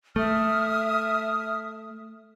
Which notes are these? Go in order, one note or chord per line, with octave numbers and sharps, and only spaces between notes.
A3 E5 D#6 F6